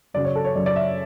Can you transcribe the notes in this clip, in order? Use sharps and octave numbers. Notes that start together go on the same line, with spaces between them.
F#2 C#3 F#3 D5
C#5
A4
C#5
F#2 C#3 F#3 D5
D5
E5